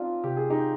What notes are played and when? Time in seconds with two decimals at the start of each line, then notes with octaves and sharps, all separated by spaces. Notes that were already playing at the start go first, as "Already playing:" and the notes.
Already playing: C4 D4 D#4 F4
0.24 C3 G4
0.37 G#4
0.50 D#4 G4